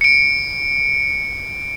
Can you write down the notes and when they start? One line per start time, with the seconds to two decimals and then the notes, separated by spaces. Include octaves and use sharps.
0.01 C#7 D7